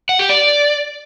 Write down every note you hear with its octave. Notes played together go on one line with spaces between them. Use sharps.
F#5
G4
D5